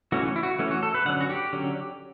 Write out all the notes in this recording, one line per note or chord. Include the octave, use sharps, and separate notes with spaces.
E3 A3 C#4 F#4
E4
F#4
E3 A3 C#4
F#4
A4
B4
D3 F#3 C#4 F#5
F#4
G4
D3 F#3 C#4